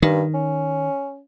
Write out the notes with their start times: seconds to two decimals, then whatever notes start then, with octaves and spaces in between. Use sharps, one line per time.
0.02 G2 D#3
0.34 C#4